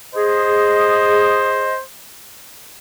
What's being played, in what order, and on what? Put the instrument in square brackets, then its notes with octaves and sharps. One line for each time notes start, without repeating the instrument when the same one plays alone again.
[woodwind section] G#4 D#5 [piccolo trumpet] C5